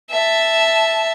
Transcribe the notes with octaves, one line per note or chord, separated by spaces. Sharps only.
E5 A5